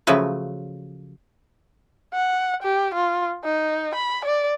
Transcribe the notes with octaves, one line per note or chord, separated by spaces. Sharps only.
C#3 F3 F#3 A3 B4
F#5
G4
F4
D#4
B5
D5